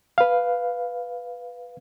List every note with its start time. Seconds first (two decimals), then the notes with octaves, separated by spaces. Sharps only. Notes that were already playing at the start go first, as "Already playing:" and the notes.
0.18 B4 F5